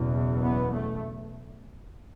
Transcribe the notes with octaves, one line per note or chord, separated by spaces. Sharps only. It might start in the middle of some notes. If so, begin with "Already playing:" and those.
Already playing: F#1 E2 B2
B3
A3